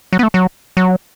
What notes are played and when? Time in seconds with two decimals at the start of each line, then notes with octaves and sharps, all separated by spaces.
0.13 F#3
0.19 B3
0.23 A3
0.34 F#3
0.77 F#3